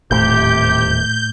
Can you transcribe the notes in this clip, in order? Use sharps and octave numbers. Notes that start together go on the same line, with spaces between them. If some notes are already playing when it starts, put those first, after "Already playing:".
D#1 E2 A2 C3 G4 G6